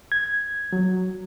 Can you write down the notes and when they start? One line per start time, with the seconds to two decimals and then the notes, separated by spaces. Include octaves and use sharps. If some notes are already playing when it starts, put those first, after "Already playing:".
0.12 G#6
0.73 F#3